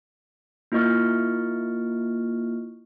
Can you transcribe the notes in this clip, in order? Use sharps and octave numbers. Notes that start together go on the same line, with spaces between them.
A#3 E4 F4 D#5 C#6 F6